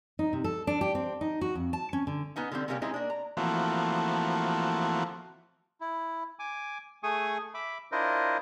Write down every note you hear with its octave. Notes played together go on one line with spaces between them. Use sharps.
D#4
C3
A4
D4
G4
C4
D#4
F#4
F2
A5
C#4
D3
B3 C#4 D#4 F#5
D3 G3 B3 C4
C3 G3 A#3 C#4 F#4 G4
G#3 C4 C#4 D#4 E4 G#4
A#3 D4
A#5
E3 F3 A3 A#3 C4 F#4
E4
G#5 D6
A3 G#4 G#5 C#6 D#6
E5 B5 D6
D4 E4 F4 A#4 C5 D#5